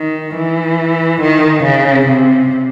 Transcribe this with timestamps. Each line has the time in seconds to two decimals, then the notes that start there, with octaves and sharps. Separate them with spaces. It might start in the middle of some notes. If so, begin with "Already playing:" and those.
Already playing: D#3
0.36 E3
1.21 D#3
1.64 C#3
2.07 C3